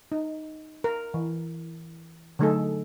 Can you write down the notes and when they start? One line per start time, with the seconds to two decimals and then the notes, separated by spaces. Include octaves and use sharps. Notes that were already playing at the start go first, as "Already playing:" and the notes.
0.12 D#4
0.84 A#4
1.14 E3
2.39 D3 F#3 A3 D#4 G#4 A4